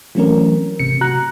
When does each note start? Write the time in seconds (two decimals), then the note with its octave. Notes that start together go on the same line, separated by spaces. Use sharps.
0.15 E3 F#3 A3 C4 C#4 A#4
0.79 G#1 C3 C#7
1.01 C3 F#4 A#5 F#6